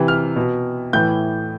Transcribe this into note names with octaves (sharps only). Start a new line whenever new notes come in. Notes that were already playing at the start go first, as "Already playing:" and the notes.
Already playing: C3 E3
F6
B2
A2 E3 G6